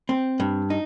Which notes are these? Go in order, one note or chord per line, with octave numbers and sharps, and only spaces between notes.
C4
G2
D#4